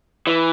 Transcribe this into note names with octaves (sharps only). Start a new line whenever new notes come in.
E3